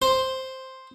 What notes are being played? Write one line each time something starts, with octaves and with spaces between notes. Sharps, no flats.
C5